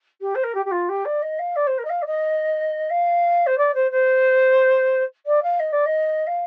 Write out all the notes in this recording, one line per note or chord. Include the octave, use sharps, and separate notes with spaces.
G4
C5
A#4
G4
G4
F4
G4
D5
D#5
F5
D5
C5
A#4
D#5
F5
D5
D#5
F5
C5
D5
C5
C5
D5
F5
D#5
D5
D#5
F5